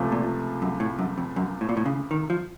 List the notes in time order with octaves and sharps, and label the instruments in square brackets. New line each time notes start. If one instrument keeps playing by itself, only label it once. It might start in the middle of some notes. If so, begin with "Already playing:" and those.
Already playing: [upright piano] C#2 C3 F3 A3
[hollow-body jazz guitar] A#2
F#2
A2
F#2
F2
F#2
A2
A#2
A2
C#3
D#3
F3